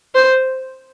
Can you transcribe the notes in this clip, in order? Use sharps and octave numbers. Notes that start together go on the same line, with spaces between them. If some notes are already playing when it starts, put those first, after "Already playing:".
C5